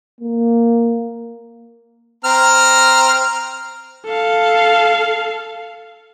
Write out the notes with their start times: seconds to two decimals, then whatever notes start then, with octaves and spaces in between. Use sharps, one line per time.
0.21 A#3
2.25 C4 A#5 F6
4.06 A4 F5